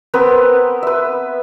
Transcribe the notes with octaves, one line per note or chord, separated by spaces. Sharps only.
B3 C4 A#4 B4
B4 E5